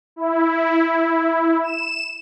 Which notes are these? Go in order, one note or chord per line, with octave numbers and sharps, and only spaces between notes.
E4
E7